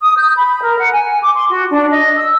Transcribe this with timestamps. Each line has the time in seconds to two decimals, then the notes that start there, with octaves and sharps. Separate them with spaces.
0.03 D#6
0.17 G6
0.36 B5
0.62 A#4
0.79 F#5
0.93 G#5
1.22 D6
1.35 C6
1.49 F#4
1.72 D4
1.91 D#5
2.16 E6